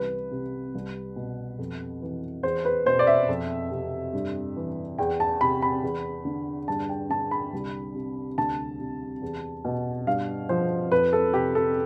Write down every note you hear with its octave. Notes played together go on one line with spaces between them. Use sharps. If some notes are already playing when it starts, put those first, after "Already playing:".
Already playing: C2 E3 B4
C3
C2
B2
F2
E3
E2 C5
B4
B2 C5
D5
E5
F2
C3
G2
E3
E2 G5
A5
C3 B5
B5
E2
D3
G2 A5
G5
D3 A5
B5
C2
C3
D2 A5
C3
E2
B2
G2 F5
F3 C5
F2 B4
A4
C3 G4
A4